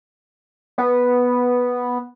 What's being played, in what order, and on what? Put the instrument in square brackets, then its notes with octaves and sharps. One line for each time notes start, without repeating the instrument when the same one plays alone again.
[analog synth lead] B3